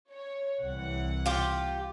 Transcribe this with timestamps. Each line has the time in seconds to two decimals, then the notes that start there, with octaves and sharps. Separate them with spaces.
0.13 C#5
0.63 C2 E3 F#5
1.26 F4 G4